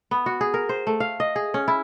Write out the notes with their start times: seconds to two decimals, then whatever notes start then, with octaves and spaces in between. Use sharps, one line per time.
0.11 B3
0.26 F#4
0.41 G#4
0.54 A#4
0.69 C5
0.87 A3
1.00 F5
1.20 D#5
1.36 G#4
1.54 C#4
1.68 E4